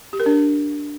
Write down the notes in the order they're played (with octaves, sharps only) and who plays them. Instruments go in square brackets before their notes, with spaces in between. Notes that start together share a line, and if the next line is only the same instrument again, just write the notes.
[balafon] G4
A#4
D4